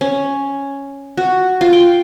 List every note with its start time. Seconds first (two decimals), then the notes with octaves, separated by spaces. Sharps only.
0.01 C#4
1.17 F#4
1.61 F4
1.73 G5